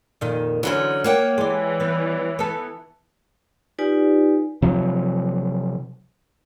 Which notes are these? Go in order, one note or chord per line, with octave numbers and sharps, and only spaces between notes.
F2 A#2 D#3
D3 E3 F#3 C#4 C5
A#3 C#5 F#5 G5
E3 G#3 D5
G3 B3
B3 A4
D#4 F4 G4 B4 D5 G#5
C3 F3 F#3